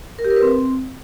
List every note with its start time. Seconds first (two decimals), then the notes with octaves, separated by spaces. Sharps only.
0.19 A#4
0.25 G4
0.30 A#4
0.36 B4
0.42 C4